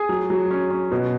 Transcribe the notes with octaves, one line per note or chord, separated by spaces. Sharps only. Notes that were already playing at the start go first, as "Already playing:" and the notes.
Already playing: G#4
F#3
F#3
C#4
C#4
B2